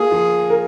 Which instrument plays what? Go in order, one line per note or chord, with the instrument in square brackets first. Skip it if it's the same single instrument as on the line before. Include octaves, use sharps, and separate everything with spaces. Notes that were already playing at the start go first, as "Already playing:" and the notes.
Already playing: [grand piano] A#3 F4 [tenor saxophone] G#4
[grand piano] F3
A#4